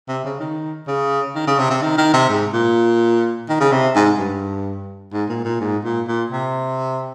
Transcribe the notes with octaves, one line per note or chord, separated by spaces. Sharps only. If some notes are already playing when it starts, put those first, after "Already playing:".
C3
C#3
D#3
C#3
D#3
C#3
C3
C3
D#3
D#3
C3
G#2
A#2
D#3
C#3
C3
G#2
G2
G#2
A#2
A#2
G#2
A#2
A#2
C3